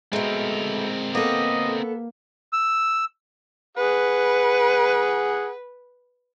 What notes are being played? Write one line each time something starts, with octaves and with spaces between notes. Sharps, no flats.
B2 G#3 A3 C4 A#4
A#3 B3 A4 D#5
E6
G#4 B4 F#5